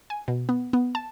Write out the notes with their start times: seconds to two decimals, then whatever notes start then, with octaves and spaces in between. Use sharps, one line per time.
0.10 G#5
0.28 B2
0.49 B3
0.73 B3
0.95 A5